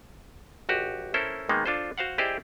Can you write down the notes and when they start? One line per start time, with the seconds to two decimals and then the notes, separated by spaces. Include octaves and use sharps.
0.69 A#1 F#4 G4
1.14 C#4 E4 A4 A#4 C5
1.49 D#3 G#3 A#3 B3 D#4
1.66 D4 F4 A4 C5
1.98 F#4 C5 F5 F#5
2.18 E4 G4 G#4 C5 D5 D#5